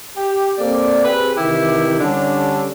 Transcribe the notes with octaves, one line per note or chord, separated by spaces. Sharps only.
G4
A#3 C4 A4 D5
C4 G4 G#4 B4
C3 D#3 E3 E4 G4
D3 G3 C#4 D4 G4 A4